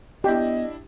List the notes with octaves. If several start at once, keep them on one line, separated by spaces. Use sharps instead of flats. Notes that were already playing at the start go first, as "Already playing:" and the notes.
B3 D4 E4 G4 D#5